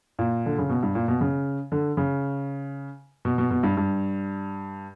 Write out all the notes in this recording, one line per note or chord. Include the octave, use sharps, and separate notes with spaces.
A#2
D3
C#3
B2
G2
A#2
B2
C#3
D3
C#3
B2
B2
B2
G2
G2